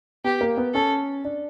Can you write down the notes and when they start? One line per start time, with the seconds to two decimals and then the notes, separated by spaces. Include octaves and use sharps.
0.24 B3 G4
0.41 A#3
0.57 B3
0.74 C#4 A4
1.25 D4